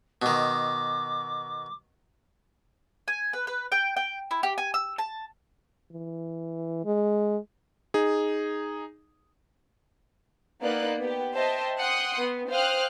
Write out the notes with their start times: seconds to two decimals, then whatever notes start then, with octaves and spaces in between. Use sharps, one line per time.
0.22 B2 D#3 D6
3.08 G#5
3.33 B4
3.47 B4
3.72 G5
3.97 G5
4.31 E4
4.43 G4
4.58 G#5
4.74 E6
4.98 A5
5.91 E3
6.85 G#3
7.94 D#4 G#4
10.62 A#3 B3 D#4 D5 F#6
11.00 B3 G4
11.35 C5 D#5 E5 G5 A5
11.78 F#5 G5 C6 D#6
12.18 B3
12.50 C5 F5 G5 D#6 F6 F#6